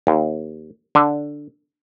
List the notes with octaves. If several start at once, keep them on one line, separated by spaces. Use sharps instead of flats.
D#2
D3